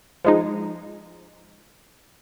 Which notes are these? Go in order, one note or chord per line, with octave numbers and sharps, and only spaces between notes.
F3 G#3 D#4